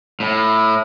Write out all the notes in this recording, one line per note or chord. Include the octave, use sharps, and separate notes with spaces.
A2